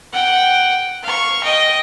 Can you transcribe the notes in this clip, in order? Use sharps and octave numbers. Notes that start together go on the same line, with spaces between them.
F#5 G5
F5 C#6
D#5 G5